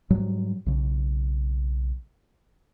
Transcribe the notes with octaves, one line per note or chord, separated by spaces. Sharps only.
G#2 F#3 G3
B1 C#3